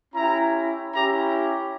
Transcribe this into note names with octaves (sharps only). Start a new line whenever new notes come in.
C#4 E4 G4 A#5
C#4 E4 G4 A#5